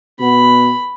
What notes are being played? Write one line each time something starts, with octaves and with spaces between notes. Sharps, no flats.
B2 B3 B5